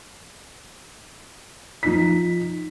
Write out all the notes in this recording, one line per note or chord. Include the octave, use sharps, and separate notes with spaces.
F3 D#4 F4 B6